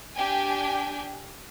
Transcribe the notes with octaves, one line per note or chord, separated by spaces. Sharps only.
D4 G4 G5 G#5